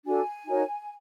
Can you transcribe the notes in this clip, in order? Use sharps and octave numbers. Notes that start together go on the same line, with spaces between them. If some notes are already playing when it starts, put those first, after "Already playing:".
D4 F#4 A4 G#5
D#4 F#4 A#4 C#5